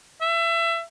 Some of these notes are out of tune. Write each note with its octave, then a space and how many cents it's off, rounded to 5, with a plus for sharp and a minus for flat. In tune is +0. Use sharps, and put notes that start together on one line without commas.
E5 +25